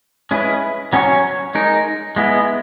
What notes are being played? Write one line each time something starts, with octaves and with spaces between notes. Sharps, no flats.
G#3 C#4 E4 B4
F#3 C#4 F#4 C#5
G#3 D#4 A#4
G#3 B3 E4